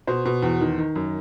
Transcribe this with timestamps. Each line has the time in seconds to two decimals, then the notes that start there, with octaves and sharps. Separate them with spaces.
0.07 B2 C5
0.25 B2
0.42 E2
0.60 D#3
0.78 D#3
0.95 F#2